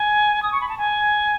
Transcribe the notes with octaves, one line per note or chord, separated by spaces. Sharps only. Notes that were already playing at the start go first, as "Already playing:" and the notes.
Already playing: G#5
D#6
C#6
B5
A5
G#5